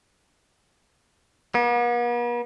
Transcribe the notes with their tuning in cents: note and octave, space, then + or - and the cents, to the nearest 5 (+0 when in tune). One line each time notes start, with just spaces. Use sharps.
B3 -45